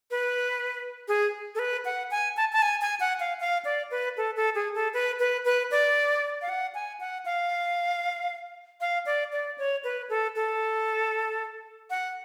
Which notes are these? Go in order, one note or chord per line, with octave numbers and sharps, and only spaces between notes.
B4
G#4
A4
B4
F#5
G#5
A5
A5
G#5
G#5
F#5
F5
F5
D5
B4
A4
A4
G#4
A4
B4
B4
B4
D5
F5
F#5
G#5
F#5
F5
F5
D5
D5
C#5
B4
A4
A4
F#5